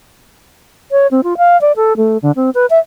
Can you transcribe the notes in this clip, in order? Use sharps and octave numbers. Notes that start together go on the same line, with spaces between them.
C#5
C4
F4
F5
D5
A4
A3
D3
C4
B4
E5